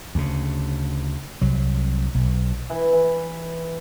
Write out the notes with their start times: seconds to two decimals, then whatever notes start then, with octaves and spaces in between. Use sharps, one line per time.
0.15 D2 C#3
1.42 C2 F#3
2.15 B1
2.70 E3
2.93 E3